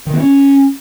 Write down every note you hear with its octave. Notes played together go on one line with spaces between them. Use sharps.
D#3
B3
C#4